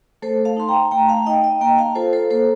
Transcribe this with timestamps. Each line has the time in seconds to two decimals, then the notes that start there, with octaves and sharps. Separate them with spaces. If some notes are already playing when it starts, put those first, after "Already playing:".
0.22 A3 A4 C5
0.45 F5 A5
0.57 D#4 C6
0.68 G5 A#5
0.91 A3 G5 A#5
1.09 F5 A5
1.26 D#4 D#5 G5
1.44 D#5 G5
1.61 A#3 G5 A#5
1.78 F5 A5
1.95 F4 A4 C5
2.13 A4 C5
2.30 A#3 A4 C5